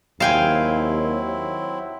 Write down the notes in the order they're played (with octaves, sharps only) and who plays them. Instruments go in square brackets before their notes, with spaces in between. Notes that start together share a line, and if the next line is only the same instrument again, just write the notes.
[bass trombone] D#2 [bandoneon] F#3 C4 E4 [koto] F5 G5 G#5